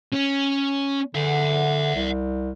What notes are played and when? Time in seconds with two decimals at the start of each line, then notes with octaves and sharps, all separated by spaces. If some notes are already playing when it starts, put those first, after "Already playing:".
0.12 C#4
1.15 D3 E5 F#5
1.96 C2